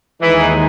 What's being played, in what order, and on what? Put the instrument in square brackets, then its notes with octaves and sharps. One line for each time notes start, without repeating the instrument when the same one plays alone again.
[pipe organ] D#2 D#3 G#3 D#4 G#4 [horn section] E3